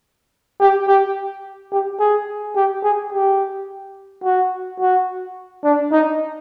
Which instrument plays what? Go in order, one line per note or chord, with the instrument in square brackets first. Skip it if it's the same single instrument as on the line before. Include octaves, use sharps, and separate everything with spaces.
[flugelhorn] G4
G4
G4
G#4
G4
G#4
G4
F#4
F#4
D4
D#4